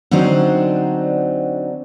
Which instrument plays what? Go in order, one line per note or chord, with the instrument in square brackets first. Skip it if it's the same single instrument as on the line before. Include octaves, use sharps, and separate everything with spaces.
[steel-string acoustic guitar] D3 F#3 C4 D4 D#4 C5